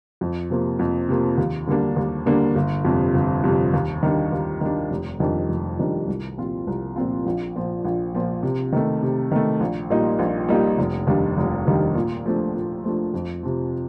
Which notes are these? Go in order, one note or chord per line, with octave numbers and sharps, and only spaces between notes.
F2
C3 F3 A#3
F2
C3 F3 A#3
D#2
D3 G3 A#3 D4
D#2
D3 G3 A#3 D4
G1
F2 C3 G3
G1
F2 C3 G3
D#2
D#3 G3 D4
D#2
D#3 G3 D4
F1
F2 D#3 G3 D4
F1
F2 D#3 G3 D4
C2
A#2 F3 C4 F4
C2
A#2 F3 C4 F4
A#1
A#2 F3
A#1
A#2 F3
C3
D#3 A3
C3
D#3 A3
A#1
A#2 G3 A#3 D#4
A#1
A#2 G3 A#3 D#4
F1
D#2 D#3 G3 D4
F1
D#2 D#3 G3 D4
A#2
F3 A3 D4
A#2
F3 A3 D4
F2
C3 F3